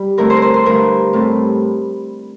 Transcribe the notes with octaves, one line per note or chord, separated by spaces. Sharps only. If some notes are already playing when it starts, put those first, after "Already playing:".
Already playing: G3 D5
D3 A3 C4 E4 A#4
C5
A#4
C5
C5
G2 D3 A3 D4 A#4
A2 G3 C4